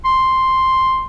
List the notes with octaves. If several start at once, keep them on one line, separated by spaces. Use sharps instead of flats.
C6